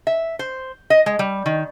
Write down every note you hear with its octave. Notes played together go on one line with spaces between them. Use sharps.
E5
C5
D#5
G#3
G3
D#3